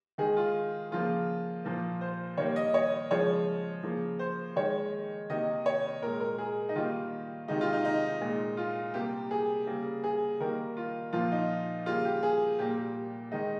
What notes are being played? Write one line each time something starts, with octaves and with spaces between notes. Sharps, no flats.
D#3 G#3 G#4
F4
C#3 F3 A#3 F4
A#2 F3 A#3
C5
D#3 G3 A#3 C#5
D#5
C#5
C#3 F3 G#3 C#5
C#3 F3 A#3
C5
D#3 G#3 C#5
C3 D#3 A#3 D#5
C#5
A#2 G#3 A#4
A#4
G#4
D#4
D#3 G3 A#3 F4
C3 D#3 G#3 D#4
F4
D#4
D#4
A#2 G#3
F4
C3 G3 A#3 G4
G#4
C#3 G3 A#3
G#4
D#3 G3 A#3 A#4
F4
A#2 F3 A#3 F4
D#4
C#3 G3 A#3 F4
G4
G#4
A#2 G3 A#3 G4
G4
D#3 G#3 D#4